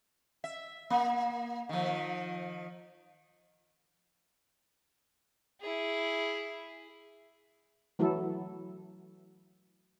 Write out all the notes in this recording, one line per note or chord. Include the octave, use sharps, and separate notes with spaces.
E5
A#3
D#3 F3
E4 G#4
E3 F#3 A3 E4 A4